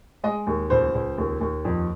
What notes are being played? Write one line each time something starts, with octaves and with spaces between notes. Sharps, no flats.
G#3 D#5
D#2
C#2 C5
C#2
D#2
D#2
F2